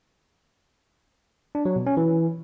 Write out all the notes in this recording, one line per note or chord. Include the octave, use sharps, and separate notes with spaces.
D4
F#3
B2
C#4
E3